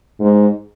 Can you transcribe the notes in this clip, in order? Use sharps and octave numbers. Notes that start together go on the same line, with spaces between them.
G#2